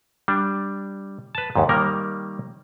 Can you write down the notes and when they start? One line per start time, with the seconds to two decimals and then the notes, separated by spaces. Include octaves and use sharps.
0.28 G3 D4
1.35 B4 A5
1.55 D#2 G#2
1.69 D#3 G3 A#3 A#4